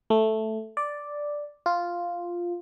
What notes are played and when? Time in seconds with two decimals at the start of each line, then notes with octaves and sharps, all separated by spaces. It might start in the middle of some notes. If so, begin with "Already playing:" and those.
0.10 A3
0.77 D5
1.66 F4